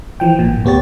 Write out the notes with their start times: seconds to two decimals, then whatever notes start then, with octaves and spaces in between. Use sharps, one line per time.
0.20 E3 F3 G5
0.39 G#1 A#2
0.65 D2 B3 G4 C#5 A6